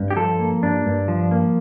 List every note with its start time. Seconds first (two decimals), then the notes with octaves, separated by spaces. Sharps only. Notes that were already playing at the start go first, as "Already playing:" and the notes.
Already playing: G2
0.11 G4
0.16 F3 A4
0.39 A#3
0.63 G2 D4
0.86 G2
1.08 F3
1.31 A#3